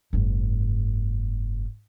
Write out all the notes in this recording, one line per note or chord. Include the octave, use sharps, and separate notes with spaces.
F#1 G#2